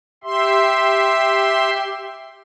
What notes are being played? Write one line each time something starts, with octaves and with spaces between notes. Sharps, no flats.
G4 E5 C6